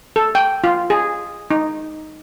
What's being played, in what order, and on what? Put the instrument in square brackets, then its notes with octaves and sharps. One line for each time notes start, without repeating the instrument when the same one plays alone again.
[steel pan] A4
G5
F4
G#4
D#4